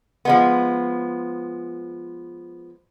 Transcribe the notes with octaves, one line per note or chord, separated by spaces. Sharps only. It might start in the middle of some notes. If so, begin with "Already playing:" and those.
F3 G#3 B3